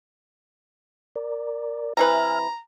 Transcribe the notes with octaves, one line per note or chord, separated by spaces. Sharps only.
A#4 D5
C3 E3 B4 E5 G#5 A#5 F6